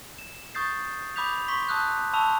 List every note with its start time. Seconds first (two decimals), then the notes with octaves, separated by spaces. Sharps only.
0.19 E7
0.55 C#6 D#6 G6 A6 C7
1.16 B5 D6 D#6 G6 B6 F7
1.48 C6 C#6 B6
1.68 A5 D#6 E6 F#6 G6
2.14 A5 B5 C#6 E6 F7